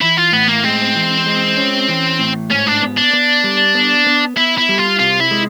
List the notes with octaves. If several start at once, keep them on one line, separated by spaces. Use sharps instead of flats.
E3 E4
F4
A2 B3
A#3
G#3 C4
E3
G#3
C#4
E3
A2
G#2 C#4
D4
B3
D4
B3
G3
B3
B3
B3 E4
E4
G3
F4
C3 F4
E4
G#3